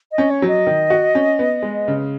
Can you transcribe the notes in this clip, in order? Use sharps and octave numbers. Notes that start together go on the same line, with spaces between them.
D#5
C#4
C#5
F#3
D#5
D#3
F#4
C#4
B3
G#3
C#3